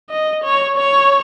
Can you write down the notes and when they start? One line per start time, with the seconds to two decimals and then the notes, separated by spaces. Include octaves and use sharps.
0.10 D#5
0.44 C#5
0.77 C#5